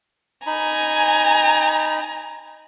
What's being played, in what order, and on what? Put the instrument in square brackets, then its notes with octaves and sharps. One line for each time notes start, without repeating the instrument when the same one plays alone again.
[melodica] D#4 B5 [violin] G#5 A#5